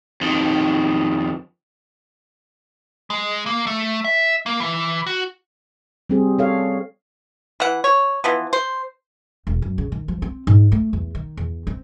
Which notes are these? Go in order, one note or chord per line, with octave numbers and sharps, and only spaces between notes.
F2 D#3
G#3
A#3
A3
E5
A#3
E3
F#4
G3 C4 G#4
A4 C#5 F5
E3 F#5
C#5
E3 F3 B3
C5
E1
F#2
C#3
D#3
F3
C4
G#2
A3
E2
D#3
E2
C4